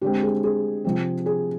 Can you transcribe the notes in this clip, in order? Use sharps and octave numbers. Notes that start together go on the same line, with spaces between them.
D3 G#3 C4 G4
G#4
G#4
C3 F3 C4
G#4